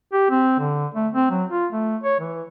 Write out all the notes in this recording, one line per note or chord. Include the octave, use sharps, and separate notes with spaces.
G4
C4
D3
A3
C4
F#3
F4
A3
C#5
E3